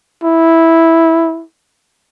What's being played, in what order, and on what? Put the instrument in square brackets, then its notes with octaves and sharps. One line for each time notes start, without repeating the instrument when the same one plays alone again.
[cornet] E4